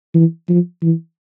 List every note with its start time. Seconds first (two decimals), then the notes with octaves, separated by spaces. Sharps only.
0.14 E3
0.49 F3
0.82 E3